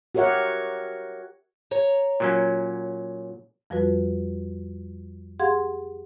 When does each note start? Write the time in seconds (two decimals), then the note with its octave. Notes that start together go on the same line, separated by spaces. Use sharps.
0.15 F#4 G4 A#4 C#5 E5 F#5
1.71 C#5 A#5
2.20 A#2 F#3 C#4
3.70 F2 F3 G3 F4 F#4 B4
5.40 G4 G#4 F5 F#5 C6 G#6